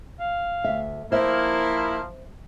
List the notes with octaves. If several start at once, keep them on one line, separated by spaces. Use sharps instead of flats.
F5
D2 E5
F3 A#3 E4 C5 E5